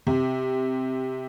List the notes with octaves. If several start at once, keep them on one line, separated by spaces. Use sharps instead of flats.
C3